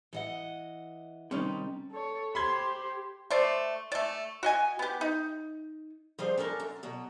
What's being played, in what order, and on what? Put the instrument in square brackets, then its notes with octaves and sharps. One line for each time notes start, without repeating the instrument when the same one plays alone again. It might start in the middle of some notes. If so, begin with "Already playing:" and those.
[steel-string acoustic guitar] E3 D#5 F#5
[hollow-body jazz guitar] C3 C#4 D#4 [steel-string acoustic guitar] D#3 G3
[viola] A4 C#5
[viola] G4 C5 [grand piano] B5 C6 G#6
[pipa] A3 C5 D5
A3 D5
F#4 D#5 G#5
B3 G4
D#4
[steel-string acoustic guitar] F3 G3 G#4 C5
C#4 D4 A4 A#4
F#2
B2 F#3